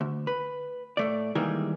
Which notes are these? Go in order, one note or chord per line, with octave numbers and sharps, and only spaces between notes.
D2
B4
A2 A3 D5
D#3 E3 G3 G#3 A#3 G#4